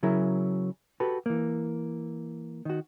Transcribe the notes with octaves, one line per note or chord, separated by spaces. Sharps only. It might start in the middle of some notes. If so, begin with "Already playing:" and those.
C#3 F#3 E4 G#4 A#4
F#4 G4 A4 B4
E3 A#3
D#3 F#4